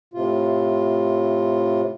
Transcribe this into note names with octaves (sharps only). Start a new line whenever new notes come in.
A2 C3 F4